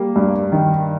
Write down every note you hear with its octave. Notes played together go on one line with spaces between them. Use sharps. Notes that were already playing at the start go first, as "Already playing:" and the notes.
Already playing: G3 A#3
G2
D#3